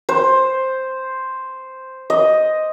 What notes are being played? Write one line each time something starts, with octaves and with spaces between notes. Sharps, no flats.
C5
D#5